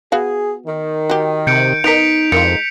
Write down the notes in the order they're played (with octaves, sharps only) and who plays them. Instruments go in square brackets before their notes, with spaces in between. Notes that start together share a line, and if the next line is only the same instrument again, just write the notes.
[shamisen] B3 F#4 F5 [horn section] G#4
[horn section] D#3
[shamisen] F#4 G4
[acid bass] C3 [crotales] G6 C#7 D7
[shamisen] B3 A#4 [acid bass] D#4 [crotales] B6 D7 F7
[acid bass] F2 [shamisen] D#3 E3 F4 [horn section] G#3 D#4 [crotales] C#7